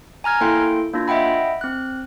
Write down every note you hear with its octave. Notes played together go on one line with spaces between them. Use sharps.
G#5 A#5 F6 G#6
A#3 E4 A4 G5 C6
A#3 D4 F4
D#5 E5 F#5 G5 B5
C4 F#6